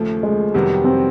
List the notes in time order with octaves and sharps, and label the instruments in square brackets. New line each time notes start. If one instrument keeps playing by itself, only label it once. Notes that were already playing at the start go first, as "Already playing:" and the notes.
Already playing: [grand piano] D#2 C#3 F3 [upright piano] A3
[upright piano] G#3
[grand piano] F2 C3 D#3 F#3 B3 [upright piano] G3
[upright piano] C4